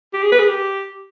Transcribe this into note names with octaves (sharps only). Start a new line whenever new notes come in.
G4
G#4
B4
G#4
G4